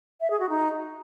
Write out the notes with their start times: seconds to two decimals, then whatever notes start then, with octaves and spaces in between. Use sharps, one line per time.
0.21 E5
0.30 G#4
0.40 F#4
0.49 D#4